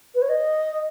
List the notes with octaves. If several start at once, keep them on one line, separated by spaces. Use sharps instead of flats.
B4
C#5
D#5